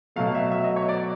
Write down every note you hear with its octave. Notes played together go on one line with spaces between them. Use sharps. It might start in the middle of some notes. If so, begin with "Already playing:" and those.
B2 F#3 A3 F5
E5
E5
D#5
C#5
D5